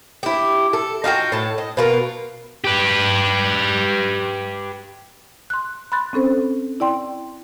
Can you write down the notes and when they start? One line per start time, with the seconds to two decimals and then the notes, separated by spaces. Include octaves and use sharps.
0.23 E4 G4
0.73 A4
1.04 D#4 F4 F#4 G5
1.32 A2 A5
1.58 D#5
1.77 B2 F4 A#4
2.65 G4 B4
5.50 C6 F#6
5.92 B5 C6 F#6 A6
6.13 C4 C#4 A4 C5
6.80 E4 D5 G5 C6